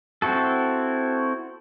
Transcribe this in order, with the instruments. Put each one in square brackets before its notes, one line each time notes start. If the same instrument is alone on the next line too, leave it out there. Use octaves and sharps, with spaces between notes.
[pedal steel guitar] C4 E4 F#4 A4